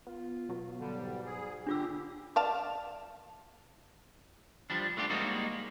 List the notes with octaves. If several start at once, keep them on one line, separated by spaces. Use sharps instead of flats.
B3 F4
B2 F#3 B3
D3 G3
G#2
G#4
D3 D4 F4 G4 E6
D5 F5 A5
F3 G3 D4
A3 D4 F4 G4
G3 G#3 A#3 C4 D#4 F#4